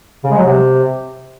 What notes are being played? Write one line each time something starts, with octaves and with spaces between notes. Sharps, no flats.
C#3
G#3
F#3
C3